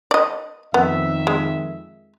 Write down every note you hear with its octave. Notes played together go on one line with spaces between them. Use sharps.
D5 D#5
F2 D#3 B3 E5
G#3